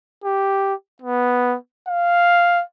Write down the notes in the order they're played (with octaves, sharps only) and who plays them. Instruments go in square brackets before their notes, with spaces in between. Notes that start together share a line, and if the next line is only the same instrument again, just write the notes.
[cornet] G4
B3
F5